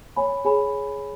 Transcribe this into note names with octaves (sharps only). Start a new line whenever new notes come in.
C#5 G#5 B5
G#4 C#5 G#5 B5